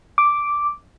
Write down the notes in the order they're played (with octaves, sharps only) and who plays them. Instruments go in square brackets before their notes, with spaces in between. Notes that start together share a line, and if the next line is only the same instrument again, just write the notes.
[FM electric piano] D6